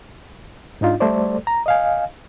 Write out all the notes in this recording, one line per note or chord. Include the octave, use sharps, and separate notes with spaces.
G#2 D4 D#4 F4
G3 A3 A4 C5 D5
A#5
D#5 F5 G#5